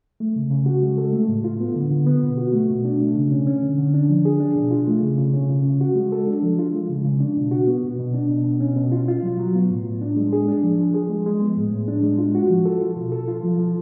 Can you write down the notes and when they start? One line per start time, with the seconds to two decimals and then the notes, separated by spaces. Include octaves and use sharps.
0.20 A3
0.36 C#3
0.51 C#3
0.66 F#4
0.83 G#3
0.98 A4
1.13 A3
1.29 A2
1.44 F4
1.60 B3
1.76 D3
1.91 D3
2.06 B3
2.23 B2
2.38 F#4
2.53 A3
2.70 B2
2.85 D4
3.00 A3
3.16 C#3
3.31 C#4
3.47 C#4
3.62 D3
3.78 D3
3.94 D4
4.09 F3
4.25 G#4
4.40 D4
4.56 B2
4.71 F4
4.87 A3
5.02 C#3
5.18 C#3
5.33 C#4
5.49 C#3
5.65 C#3
5.81 F#4
5.95 G#3
6.12 A4
6.27 D4
6.43 F3
6.59 F4
6.73 G#3
6.89 C#3
7.05 C#3
7.20 D4
7.37 B2
7.51 F#4
7.67 B3
7.83 B2
7.99 B2
8.14 D4
8.29 B2
8.45 B2
8.60 C#4
8.76 B2
8.92 F4
9.08 F4
9.23 F#3
9.39 F#3
9.55 B3
9.70 A2
9.85 A2
10.01 D4
10.16 G#3
10.33 G#4
10.48 D4
10.63 F3
10.79 F3
10.94 G#4
11.09 G#3
11.26 G#3
11.41 B3
11.57 A2
11.72 A2
11.88 D4
12.03 G#3
12.18 F4
12.35 F#4
12.49 F3
12.65 A4
12.81 F4
12.96 B2
13.12 A4
13.28 F4
13.43 F3
13.59 F3